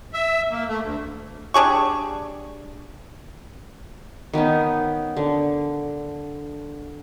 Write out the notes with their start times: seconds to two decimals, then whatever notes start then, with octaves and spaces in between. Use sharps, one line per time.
0.13 E5
0.51 A#3
0.69 A3
0.83 D2
1.54 G3 D4 G#4 C#6
4.33 D#3 B3 C#4 D#4
5.17 D3